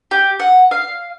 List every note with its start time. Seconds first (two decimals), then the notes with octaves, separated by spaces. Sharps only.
0.11 G4
0.40 F#5
0.71 F5